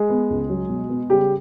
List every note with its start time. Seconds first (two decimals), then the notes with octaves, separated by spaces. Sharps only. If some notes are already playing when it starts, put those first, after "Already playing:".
Already playing: G#3 G#4
0.10 B3
0.30 C#2
0.50 F#3
0.70 B2
0.90 B3
1.10 C#3 G3 G4